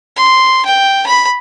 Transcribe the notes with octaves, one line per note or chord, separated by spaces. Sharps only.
C6
G5
B5